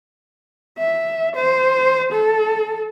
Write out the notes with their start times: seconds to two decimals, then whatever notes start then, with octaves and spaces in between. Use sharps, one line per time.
0.78 E5
1.35 C5
2.12 A4